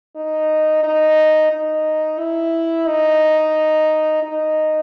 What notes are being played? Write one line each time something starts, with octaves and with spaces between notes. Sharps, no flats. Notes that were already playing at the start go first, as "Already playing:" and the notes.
D#4
D#4
D#4
E4
D#4
D#4